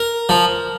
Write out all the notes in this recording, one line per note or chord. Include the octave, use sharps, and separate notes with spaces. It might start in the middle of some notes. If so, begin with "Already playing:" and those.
Already playing: A#4
F3